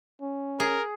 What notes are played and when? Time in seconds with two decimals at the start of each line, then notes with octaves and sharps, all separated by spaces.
0.21 C#4
0.60 G#4 A#4